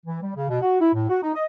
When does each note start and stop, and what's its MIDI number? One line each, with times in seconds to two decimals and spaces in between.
0.06 0.22 52
0.22 0.32 55
0.36 0.50 49
0.50 0.61 47
0.62 0.80 66
0.81 0.91 64
0.94 1.06 45
1.09 1.19 66
1.23 1.33 63
1.35 1.45 75